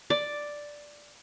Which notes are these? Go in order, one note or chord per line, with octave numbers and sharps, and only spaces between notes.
D5